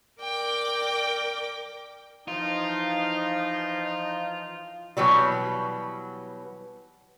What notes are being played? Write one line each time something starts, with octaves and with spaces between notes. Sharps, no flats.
A#4 D5 G5 D6
E3 F3 D#4 F4
B2 E3 F#3 G3